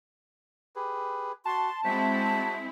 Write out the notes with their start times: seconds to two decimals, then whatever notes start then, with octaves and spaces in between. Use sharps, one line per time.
0.76 G4 G#4 B4
1.45 F#4 A5 C6
1.84 G#3 C4 E4 F#4 C5 E5